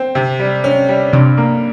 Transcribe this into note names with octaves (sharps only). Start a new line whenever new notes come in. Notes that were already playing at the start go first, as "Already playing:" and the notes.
Already playing: C4
C3
G3
C#4
G3
G2 C3
A#3